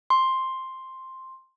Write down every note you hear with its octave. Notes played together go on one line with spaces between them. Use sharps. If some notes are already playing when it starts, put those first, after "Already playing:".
C6